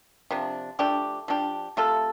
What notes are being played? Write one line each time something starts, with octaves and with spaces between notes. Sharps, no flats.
C3 F3 D4
F3 A3 D4 G4
F3 D4 G4
C3 A3 F4 A4